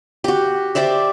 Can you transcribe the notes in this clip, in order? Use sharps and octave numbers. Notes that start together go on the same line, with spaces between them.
F#4 G4
G4 C5 D5 E5